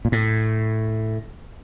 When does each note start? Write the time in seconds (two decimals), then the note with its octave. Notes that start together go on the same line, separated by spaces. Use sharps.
0.05 A#2
0.12 A2